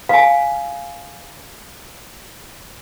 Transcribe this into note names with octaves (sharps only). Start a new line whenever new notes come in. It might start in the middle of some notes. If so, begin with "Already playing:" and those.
F5 G#5